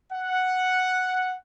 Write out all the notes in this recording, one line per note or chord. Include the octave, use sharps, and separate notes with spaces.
F#5